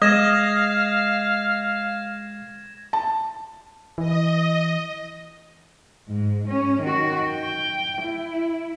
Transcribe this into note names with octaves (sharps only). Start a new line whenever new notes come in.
G#3 D#5 F5 D#6 G#6 A#6 E7
A5
E3 D#5
G#2
C#4
D#3 F#4
G5
E4